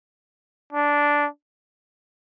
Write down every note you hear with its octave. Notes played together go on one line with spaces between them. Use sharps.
D4